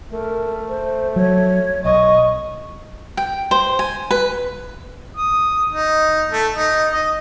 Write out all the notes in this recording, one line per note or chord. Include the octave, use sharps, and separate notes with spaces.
A3 A#4
C5
F#3 C#5
B1 D#5 C#6
G5
C5
G#5
B4
D#6
D#4
A3
D#4
D#5